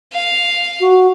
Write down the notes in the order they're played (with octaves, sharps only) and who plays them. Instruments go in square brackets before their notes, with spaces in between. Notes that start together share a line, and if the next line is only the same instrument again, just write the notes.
[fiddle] F5
[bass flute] F#4